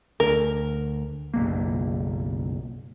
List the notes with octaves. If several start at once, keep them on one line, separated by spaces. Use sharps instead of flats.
D2 A#4
F#1 B1 A#3